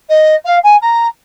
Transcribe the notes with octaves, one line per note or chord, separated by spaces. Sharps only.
D#5
F5
G#5
A#5